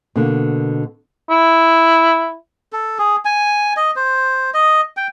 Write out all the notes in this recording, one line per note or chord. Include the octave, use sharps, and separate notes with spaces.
B2 D3 A#3
E4
A4
G#4
G#5
D#5
C5
D#5
G5